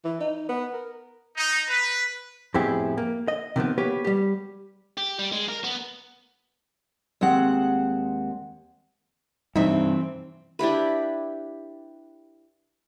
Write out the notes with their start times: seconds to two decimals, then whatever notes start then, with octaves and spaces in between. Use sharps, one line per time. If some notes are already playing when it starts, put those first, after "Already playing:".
0.05 E3
0.21 D#4
0.49 B3
0.73 A#4
1.37 D#4
1.68 B4
2.54 F2 A2 B3 E4 G4 G#4
2.98 A#3
3.28 D#5
3.56 C3 D#3 F3 B3
3.78 A#3 B3 G4 B4 C#5
4.05 G3 G4
4.97 G4
5.19 G3
5.32 G#3
5.48 A#4
5.64 B3
7.21 D#2 G#3 C4 F#5
9.56 G2 C3 E3 C4 D#4 E5
10.59 D4 E4 G4 B4